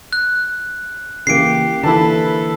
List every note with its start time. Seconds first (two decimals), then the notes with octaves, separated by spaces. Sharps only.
0.13 F#6
1.27 C#3 E3 A#3 G4 C7 D7
1.83 D3 E3 A#3 E4 A4 B4 A5